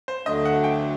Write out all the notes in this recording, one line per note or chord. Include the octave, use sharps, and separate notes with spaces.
C5
D2 D3 F#3 A3 D4 D#5
F#5
G5